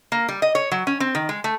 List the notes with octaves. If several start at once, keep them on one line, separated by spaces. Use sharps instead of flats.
A#3
G3
D#5
C#5
F#3
C#4
C4
D#3
G#3
A3